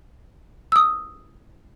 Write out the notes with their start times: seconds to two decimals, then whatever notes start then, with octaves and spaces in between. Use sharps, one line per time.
0.72 D#6 E6